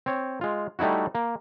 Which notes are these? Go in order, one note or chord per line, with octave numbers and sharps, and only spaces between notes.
C4 C#5
G#3 F4
G3 A3 D#4 E4 F#4
A#3